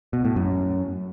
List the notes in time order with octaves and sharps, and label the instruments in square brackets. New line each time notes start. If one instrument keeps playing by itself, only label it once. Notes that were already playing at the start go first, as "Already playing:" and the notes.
[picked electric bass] B2
A2
F#2